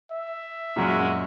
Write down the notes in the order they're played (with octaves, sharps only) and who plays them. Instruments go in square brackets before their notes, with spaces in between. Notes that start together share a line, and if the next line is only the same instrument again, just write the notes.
[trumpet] E5
[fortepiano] F#2 A#2 [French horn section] G#3 F#4